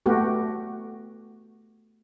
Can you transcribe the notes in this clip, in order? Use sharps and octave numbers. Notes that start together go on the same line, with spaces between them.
A3 B3 F#4 G4